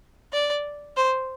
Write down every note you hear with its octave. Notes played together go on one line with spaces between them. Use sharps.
D5
C5